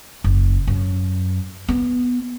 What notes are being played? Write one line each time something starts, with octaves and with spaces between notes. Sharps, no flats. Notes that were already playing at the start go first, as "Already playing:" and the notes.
F#1
F#2
B3